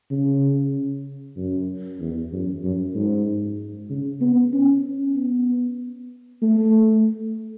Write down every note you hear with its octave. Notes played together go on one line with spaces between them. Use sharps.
C#3
F#2
E2
F#2
F#2
G#2
C#3
B3
C#4
B3
A3